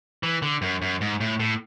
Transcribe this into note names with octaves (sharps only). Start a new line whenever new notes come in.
E3
D3
F#2
F#2
G#2
A2
A2